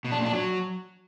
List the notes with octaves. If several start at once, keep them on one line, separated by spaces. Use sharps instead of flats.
B2
D4
A#2
D4
F#3